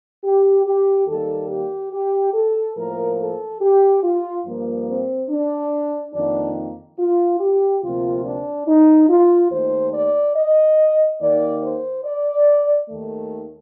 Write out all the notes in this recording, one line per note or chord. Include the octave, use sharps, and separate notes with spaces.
G4
G4
D#2 D#3 G3 A#3 A4
G4
G4
A4
A2 F3 A#3 A#4
A4
G4
F4
G2 F3 A#3
C4
D4
F2 D#3 A#3 D4
F4
G4
D2 C3 F3 A#3 F4
D4
D#4
F4
D#2 D#3 A3 C5
D5
D#5
D#2 D#3 A#3 D5
C5
D5
D#2 D#3 A3